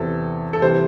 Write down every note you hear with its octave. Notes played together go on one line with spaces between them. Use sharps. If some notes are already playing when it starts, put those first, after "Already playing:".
Already playing: E2 C3 E3 C4 A4
A4
C3 E3 G3 C5